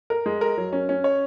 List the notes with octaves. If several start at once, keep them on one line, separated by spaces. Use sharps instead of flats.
A#4
G#3
A#4
F#3
C#4
C#4
C#5